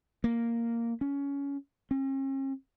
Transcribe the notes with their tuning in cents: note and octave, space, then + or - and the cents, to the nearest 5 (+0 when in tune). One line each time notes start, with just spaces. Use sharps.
A#3 -5
C#4 +20
C#4 -45